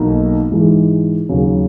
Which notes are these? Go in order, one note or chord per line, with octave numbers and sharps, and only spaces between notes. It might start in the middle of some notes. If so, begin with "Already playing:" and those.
Already playing: B1 B2 A#3 D#4
G#2 E3 G#3
D#2 C#3 F#3